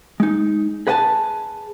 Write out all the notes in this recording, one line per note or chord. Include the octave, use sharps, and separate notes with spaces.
G#3 D#4
G#4 B4 D#5 F#5 G#5 A5